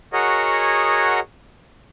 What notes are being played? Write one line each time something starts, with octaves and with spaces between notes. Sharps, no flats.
F#4 G#4 A#4 C#5 D#5 F#5